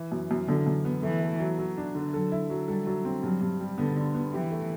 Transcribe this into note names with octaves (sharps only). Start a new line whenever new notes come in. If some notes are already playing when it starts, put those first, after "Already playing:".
Already playing: E3
F#2
F#2
F#2 D3
F#2
B3
E3 A3
A3
F#3
F#3
D4
D3
F#3 A4
E4
F#3
G3 A4
F#3
C4
G2 F#3
G2
G3
D3 B3
D3
B3
E3 G4
A3